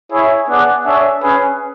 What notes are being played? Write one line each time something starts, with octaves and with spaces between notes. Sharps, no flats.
E4 G#4 C#5 E5
B3 D4 G#4 D5 F#5
D4 G#4 C#5 E5
C#4 G#4 B4